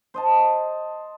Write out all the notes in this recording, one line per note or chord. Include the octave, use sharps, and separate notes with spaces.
C5 D#5 A5